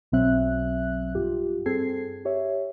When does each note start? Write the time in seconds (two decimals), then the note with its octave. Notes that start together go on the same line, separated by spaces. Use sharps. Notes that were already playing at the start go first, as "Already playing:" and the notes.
0.12 B1 B2 F#3 C4 E5 F#6
1.15 G2 F4 G4
1.66 G2 C4 G#4 A4 G#6 C7
2.25 G4 C#5 E5